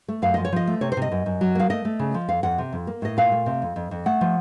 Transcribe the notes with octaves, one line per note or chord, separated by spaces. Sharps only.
A3
F#2 F5
F3 D#5
C#5
F3 D#5
A3
C3 C#5
C5
C3 D#5
F#2
F#2
F#3
A#3 F5
A3 D#5
A3
C#3
F3
F2 F5
F2 F#5
C3
F2
A#3
A2 D#5
A#2 F5
A3
C3
F2
F2
F2
A3 F#5
F3